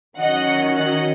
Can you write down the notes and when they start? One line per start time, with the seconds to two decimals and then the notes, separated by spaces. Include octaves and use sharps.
0.17 D#3 F#3 C#4 D#5 F#5
0.75 D#5 F#5